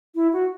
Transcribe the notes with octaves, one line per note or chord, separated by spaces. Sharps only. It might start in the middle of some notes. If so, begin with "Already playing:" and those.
E4
F#4